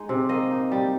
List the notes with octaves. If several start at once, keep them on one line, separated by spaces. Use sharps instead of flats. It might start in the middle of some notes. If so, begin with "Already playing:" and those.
Already playing: G#3 D#4
C3
A#3 D#5
D#4
G3